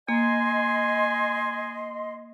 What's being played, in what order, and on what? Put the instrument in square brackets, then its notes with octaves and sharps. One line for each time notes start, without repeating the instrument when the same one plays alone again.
[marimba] A#3 [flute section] D#5 C6 [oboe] G#5